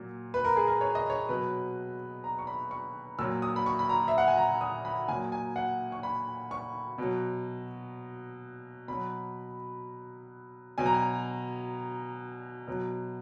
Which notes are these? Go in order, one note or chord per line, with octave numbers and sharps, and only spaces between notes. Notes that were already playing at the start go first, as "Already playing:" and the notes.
Already playing: A#2 F#3
B4
A#4
G#4
A#4
C#5
D#5
C#5
B2 F#3 B4
A#5
C#6
B5
C#6
A#2 F#3 E6
D#6
B5
C#6
B5
A#5
E5
F#5
G#5
A#5
D#6
B5
A#2 F#3 G#5
G#5
F#5
C#6
B5
C#6
B2 F#3
B2 F#3 B5
B2 F#3 G#5
A#5
G#5
B2 F#3